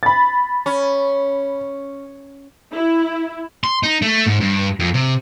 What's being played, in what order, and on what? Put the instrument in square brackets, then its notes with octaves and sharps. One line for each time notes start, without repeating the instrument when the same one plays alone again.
[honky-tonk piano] B5 A6
[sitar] C#4
[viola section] E4
[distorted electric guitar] C6
D#4
A3
G#2
G2
F2
C3